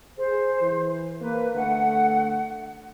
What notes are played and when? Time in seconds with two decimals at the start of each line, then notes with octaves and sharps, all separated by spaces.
0.18 G#4 C5
0.61 E3
1.21 A#3 B4
1.55 D3 A3 F#5